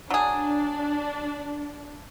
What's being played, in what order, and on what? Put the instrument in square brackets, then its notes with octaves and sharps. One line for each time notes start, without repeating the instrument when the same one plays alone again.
[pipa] F#3 G#4 [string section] D4